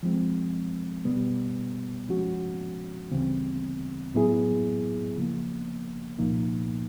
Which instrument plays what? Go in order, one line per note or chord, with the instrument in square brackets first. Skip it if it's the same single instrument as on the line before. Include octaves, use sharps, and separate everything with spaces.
[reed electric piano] F3 G#3 C4
B2 G3 B3
F3 G#3 C#4 F#4
D2 C#3 E3 G3 C4
A2 F#3 B3 E4 G#4
C#3 F3 A#3
C2 A#2 F3 A#3 D#4